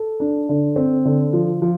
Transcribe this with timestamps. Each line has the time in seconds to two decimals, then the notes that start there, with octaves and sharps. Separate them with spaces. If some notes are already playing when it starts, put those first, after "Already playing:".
Already playing: A4
0.20 D4
0.49 D3
0.76 C4
1.05 D3
1.33 F3
1.62 F3